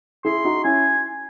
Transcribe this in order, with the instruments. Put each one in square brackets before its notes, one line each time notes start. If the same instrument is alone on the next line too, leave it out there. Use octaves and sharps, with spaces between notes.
[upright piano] E4 G#4 [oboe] C6
[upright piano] D#4 F#4
[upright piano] C#4 E4 [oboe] G#5